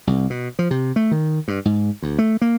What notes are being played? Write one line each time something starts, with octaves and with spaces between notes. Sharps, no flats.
C2
B2
F3
C3
A3
D#3
G2
G#2
D2
A3
A#3